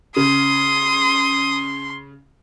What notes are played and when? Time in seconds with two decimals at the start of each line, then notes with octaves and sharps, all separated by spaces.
0.16 C#3 C6 D#6